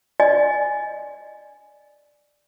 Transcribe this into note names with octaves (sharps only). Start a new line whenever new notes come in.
D5 D#5 G#5